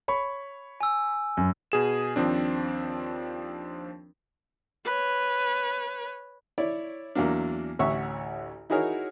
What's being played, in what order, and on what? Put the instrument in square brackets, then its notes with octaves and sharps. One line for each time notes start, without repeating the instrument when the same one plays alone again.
[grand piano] C#5 B5 C#6
[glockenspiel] G#5 E6
[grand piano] F#2
[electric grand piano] B2 G#4 E7
D#2 F3 C4 D4
[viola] B4 C#5
[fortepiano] E4 C#5 D5
E2 F#3 A#3 D4
A1 D2 C#5 E5 F#5 C#6
D#4 E4 F#4 G#4 A#4 C#5